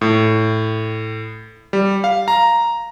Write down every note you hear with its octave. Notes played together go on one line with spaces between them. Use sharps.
A2
G3
F5
A#5